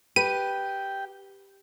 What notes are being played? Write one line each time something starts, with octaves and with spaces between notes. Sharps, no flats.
G4 B4 G5 D#7